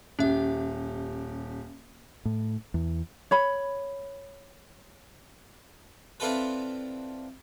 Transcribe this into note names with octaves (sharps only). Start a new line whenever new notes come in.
D#1 C#4 G4 E5
A2
E2
C#5 B5
C4 D4 E4 F4 A4 B4